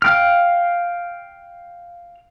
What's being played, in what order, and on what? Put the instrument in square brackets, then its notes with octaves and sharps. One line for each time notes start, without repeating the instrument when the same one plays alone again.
[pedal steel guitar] F5 G5 F6